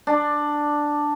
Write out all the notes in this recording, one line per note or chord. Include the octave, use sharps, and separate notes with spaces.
D4